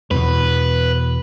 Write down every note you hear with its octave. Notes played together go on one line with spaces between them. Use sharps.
E2 B2 B4